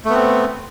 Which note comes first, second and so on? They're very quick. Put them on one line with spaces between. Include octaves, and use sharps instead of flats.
A3 B3 C4